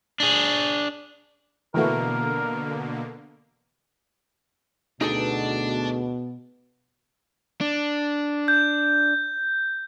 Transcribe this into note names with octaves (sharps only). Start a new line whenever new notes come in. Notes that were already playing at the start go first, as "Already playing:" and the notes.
D4 G#4
B2 D3 E3 A3 A#3 F#4 A#4
D2 B2 D4 D#4 G#4 A4
D4
G6